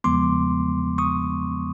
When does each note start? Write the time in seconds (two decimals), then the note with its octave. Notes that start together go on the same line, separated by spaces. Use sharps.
0.04 E2 C#3 F3 G#3 B3 C6 D6
0.98 C#6 D#6